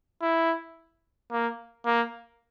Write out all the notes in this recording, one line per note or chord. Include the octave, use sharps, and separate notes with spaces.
E4
A#3
A#3